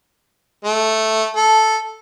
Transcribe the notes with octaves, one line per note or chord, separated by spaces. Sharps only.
A3
A4